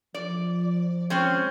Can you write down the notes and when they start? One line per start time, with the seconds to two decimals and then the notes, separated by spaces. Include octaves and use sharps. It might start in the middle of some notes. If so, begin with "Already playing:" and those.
0.14 F3 D5
1.10 G#3 C4 C#4